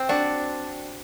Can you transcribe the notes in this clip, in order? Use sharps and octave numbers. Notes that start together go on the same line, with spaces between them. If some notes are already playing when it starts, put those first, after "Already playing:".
Already playing: C4
D4 F#4